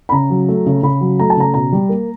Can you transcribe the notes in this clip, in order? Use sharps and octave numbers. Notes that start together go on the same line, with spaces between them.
B5
C#3 A#5
F#3
A3
C#3
C#3 B5
F#3
A3 A#5
A5
C#3 A#5
B2 A#5
G3
A#3